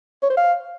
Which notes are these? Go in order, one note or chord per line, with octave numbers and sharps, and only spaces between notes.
C#5
C5
F5